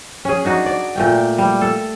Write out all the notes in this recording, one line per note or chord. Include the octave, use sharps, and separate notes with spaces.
C#4 G#4
D4 D#4 F#4
D5
A#2 A3 G5
G3
A4